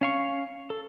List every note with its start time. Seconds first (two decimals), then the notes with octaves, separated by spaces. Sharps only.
0.01 C#4 F5 C#6
0.70 A4